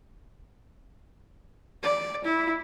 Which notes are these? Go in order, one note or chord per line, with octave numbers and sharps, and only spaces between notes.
D5
E4